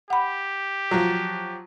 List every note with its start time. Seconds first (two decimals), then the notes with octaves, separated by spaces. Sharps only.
0.10 G4 F#5 B5
0.91 F3 F#3